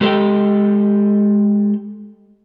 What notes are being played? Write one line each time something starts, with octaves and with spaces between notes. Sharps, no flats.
G#3 G4 A4 C5 D#5 G5